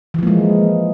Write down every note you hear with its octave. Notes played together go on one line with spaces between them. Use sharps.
E3 F3 G#3 A#3